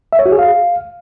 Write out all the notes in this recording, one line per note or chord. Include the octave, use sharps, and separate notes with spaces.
E5
C#5
F#4
G#4
F5